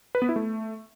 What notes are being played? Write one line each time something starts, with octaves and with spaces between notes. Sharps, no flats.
B4
B3
E4
A3